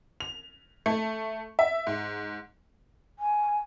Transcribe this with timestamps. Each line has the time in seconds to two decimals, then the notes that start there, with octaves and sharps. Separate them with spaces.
0.20 F7
0.86 A3
1.59 E5
1.87 G#2
3.19 G#5